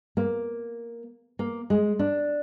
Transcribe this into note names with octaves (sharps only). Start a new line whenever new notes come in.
A#3
A#3
G#3
D4